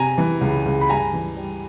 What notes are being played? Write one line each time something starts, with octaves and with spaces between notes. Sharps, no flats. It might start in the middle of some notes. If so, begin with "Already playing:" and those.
Already playing: C3 G#5 A#5
E3
C#2
C#2
B5
G2 G#5 A#5
E3
G3